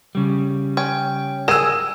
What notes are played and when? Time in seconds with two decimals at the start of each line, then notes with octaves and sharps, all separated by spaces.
0.15 C#3 G3
0.77 C#4 G5
1.48 G#4 A#4 G#5 E6 E7